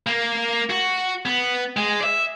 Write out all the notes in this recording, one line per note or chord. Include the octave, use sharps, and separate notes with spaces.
A#3
F#4
B3
G#3
D5 E5